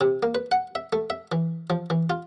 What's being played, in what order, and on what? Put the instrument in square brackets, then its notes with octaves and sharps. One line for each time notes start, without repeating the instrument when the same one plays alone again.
[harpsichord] C3
A#3
B4
F#5
E5
A3
E5
E3
F3
E3
F4